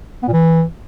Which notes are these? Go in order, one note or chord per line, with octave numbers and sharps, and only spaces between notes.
B3
A#2
E3